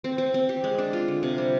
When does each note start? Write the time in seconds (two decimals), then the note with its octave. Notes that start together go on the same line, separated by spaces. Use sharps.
0.04 C4
0.18 C4
0.34 C4
0.49 G4
0.64 G#3
0.79 D4
0.93 F4
1.08 D3
1.23 C3
1.38 G3